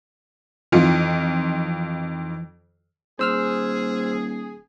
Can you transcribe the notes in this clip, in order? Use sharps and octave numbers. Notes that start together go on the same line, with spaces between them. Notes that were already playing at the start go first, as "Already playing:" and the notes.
F2 D#3 E3 F4
D#1 G#4 C5 E6 F6